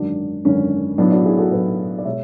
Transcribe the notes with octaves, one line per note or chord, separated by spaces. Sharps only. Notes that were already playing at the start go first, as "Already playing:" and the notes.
Already playing: G#1 F#2 D3 D4 F#4
G#1 F#2 D3 C#4
B1 A2 F#3 B3 D4
D4 F#4
E4 G#4
F#4 A4
B1 A2 F#3 G#4 B4
D5
B2 G#3 C#5 E5